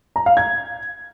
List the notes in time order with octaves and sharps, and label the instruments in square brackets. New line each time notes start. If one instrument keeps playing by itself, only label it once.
[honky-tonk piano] A#5
F5
G#6